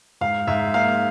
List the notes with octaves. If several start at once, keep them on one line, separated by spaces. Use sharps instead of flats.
G#2 F5
G#2 E5
A#3 F5